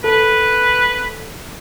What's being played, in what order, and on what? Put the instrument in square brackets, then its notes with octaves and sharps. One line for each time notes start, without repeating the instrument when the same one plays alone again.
[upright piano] A4 [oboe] B4